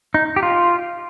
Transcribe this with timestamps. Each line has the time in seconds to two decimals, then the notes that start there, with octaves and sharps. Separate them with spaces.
0.14 D#4
0.36 G4
0.43 F4